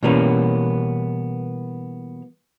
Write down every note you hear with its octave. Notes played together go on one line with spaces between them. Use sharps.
B2 E3 G3 A#3 B3 C#4